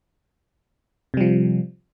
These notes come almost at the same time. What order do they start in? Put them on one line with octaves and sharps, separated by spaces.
C3 G3 F3